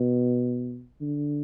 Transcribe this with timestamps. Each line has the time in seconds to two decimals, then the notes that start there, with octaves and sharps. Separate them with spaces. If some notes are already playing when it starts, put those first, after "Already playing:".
Already playing: B2
1.01 D3